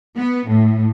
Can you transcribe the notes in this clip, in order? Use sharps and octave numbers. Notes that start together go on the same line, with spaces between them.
B3
A2